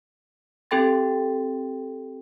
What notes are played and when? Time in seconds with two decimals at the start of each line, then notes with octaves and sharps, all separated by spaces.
0.71 C4 G4 A4 G5 C6 A6